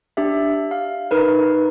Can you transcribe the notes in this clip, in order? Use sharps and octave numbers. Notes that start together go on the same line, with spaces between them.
D4 G4 E5
F5
D#4 A#4 B4